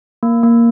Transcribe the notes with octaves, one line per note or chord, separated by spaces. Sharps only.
A#3
A#3